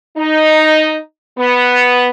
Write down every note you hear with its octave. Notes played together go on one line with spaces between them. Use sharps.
D#4
B3